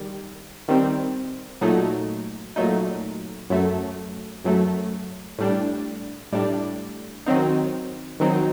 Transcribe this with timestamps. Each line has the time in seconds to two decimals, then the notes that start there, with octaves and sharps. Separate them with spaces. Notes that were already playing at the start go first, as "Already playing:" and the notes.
Already playing: D#3 G3
0.68 D#3 G3 C4
1.61 A#2 F#3 A3 D#4
2.56 A#2 F#3 A3 D#4
3.50 F#2 F#3 A3
4.44 F#2 F#3 A3
5.38 A2 G3 D4
6.32 A2 G3 D4
7.26 D#3 F#3 C4 D#4
8.20 D#3 F#3 C4 D#4